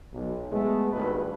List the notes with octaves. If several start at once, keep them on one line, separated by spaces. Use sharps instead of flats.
B1
G#3 A3 B3
G#1 G2 B2 B3 A4 B4